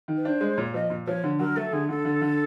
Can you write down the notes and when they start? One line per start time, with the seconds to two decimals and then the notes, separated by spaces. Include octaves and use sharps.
0.08 D#3
0.16 B4
0.25 D4 C5
0.41 G#3
0.58 A#2 C#5
0.74 F3 D#5
0.90 A#2
1.07 F3 C#5
1.24 D3
1.39 F#3 A#4
1.56 A3 A4
1.73 D3 G#4
1.89 D3 A4
2.05 D3
2.22 D3